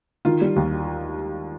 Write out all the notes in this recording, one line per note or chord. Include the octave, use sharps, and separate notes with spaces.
D#3 F4
G3
D#2